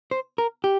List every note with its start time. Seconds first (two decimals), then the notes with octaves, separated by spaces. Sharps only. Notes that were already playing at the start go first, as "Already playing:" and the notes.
0.11 C5
0.38 A#4
0.64 G4